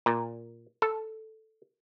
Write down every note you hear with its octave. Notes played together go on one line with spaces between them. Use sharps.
A#2
A4